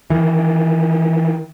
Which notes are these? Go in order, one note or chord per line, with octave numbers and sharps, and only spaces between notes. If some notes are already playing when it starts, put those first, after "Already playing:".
D#3 E3